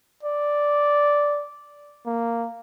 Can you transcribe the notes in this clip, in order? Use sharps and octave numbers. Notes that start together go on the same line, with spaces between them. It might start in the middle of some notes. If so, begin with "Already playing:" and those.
D5
A#3